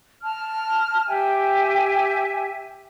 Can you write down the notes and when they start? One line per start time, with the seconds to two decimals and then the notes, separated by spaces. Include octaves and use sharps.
0.23 A5 F6
1.07 G4 E5 G5 G#5